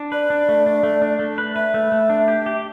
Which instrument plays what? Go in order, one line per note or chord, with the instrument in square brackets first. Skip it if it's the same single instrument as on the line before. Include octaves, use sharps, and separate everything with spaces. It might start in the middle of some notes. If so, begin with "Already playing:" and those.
Already playing: [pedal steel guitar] D4
[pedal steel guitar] B4 [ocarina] D5
[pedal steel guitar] D4
A3
D4
A3
D4
A3
B4
[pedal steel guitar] B4 [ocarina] E5
[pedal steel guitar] A3
A3
D4
G4
G4